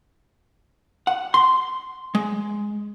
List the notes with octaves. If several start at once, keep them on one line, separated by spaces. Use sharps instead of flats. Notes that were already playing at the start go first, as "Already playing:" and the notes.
F#5
C6
G#3